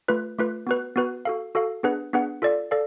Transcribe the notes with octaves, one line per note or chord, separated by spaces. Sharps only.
A3 F4 B4
A3 F4 B4
B3 F#4 B4
B3 F#4 B4
F#4 A4 F5
F#4 A4 F5
B3 D4 G#4 B4 F#5
B3 D4 G#4 B4 F#5
F4 A4 D5 F5
A4 D5 F5